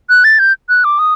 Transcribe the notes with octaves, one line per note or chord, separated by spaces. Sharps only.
F#6
A6
G6
F#6
D6
D#6